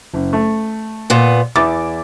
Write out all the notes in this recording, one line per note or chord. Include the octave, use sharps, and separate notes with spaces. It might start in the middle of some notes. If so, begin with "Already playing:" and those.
F#1
A3
A#2 B3
E2 E4 D6 A6